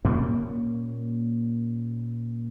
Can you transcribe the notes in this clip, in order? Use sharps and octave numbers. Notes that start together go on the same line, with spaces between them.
A#2 G3 A#3 C#4